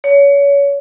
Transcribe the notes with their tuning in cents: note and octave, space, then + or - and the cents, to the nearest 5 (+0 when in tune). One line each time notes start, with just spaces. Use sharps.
C#5 +30